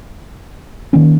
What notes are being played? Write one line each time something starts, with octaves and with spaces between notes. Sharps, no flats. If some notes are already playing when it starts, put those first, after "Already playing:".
D#3 A#3 C#4